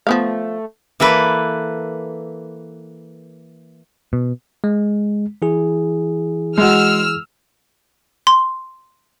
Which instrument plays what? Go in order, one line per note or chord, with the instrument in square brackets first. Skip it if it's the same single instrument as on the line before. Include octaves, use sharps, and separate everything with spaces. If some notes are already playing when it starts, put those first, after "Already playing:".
[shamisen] F3 B3 F5 [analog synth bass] A3
[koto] E3 A#3 A4 B4
[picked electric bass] B2
[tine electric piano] G#3
E3 E4 G#4
[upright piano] G#3 F#4 [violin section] E6 F6
[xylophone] C6